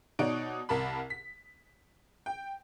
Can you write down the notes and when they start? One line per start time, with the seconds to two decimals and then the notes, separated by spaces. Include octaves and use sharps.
0.19 B2 D#4 C#5 D5 F#5 D7
0.69 C2 A#4 A5 B5
1.10 B6
2.26 G5